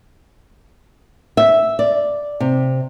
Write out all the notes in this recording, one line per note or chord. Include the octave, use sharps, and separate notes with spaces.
E5
D5
C3